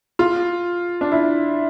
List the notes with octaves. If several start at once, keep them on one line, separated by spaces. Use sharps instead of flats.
F4
D4
E4